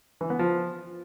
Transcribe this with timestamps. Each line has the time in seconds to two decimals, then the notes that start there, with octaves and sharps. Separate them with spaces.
0.21 E3
0.30 B3
0.39 F3